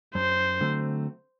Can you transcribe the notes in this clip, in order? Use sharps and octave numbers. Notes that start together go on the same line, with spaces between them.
F#2 C5
D3 F#3 A3 C4